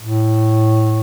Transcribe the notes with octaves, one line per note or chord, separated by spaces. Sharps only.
A2